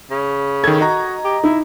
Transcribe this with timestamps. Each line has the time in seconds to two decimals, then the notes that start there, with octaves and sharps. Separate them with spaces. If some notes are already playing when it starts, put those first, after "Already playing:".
0.11 C#3
0.64 D#3 A4 G#6
0.81 F#4 D#5 A#5
1.24 G4
1.44 D#4 E4